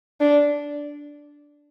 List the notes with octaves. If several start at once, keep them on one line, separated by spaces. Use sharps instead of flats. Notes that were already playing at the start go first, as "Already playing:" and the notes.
D4